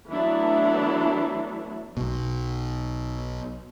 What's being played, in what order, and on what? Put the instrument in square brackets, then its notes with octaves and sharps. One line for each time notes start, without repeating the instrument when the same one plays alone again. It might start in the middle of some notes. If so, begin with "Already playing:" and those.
[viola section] E3 F#3 A3 B3 D4 E4
[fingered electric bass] B1 B2